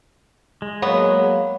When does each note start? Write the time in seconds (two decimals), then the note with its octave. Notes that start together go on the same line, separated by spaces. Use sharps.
0.62 G#3
0.82 F#3 A#3 B3 C#5